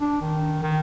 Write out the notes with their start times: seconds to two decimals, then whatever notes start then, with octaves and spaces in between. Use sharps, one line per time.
0.01 D4
0.21 D#3
0.63 D#3